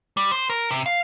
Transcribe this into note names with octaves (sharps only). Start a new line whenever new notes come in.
G3
C5
A#4
C3
F5